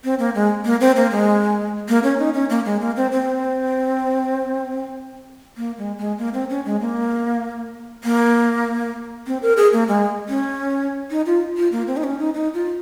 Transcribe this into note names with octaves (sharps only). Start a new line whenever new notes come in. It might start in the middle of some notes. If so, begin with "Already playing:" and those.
C4
A#3
G#3
A#3
C4
A#3
G#3
A#3
C#4
D#4
C#4
A#3
G#3
A#3
C4
C4
A#3
G#3
G#3
A#3
C4
C#4
G#3
A#3
A#3
C4
A#4
G#4
A#3
G#3
C#4
D#4
F4
F4
A#3
C4
D#4
C#4
D#4
D#4
F4